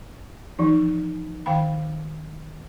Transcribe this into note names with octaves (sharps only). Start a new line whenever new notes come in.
E3 F3 D#4
D#3 F5 G5 B5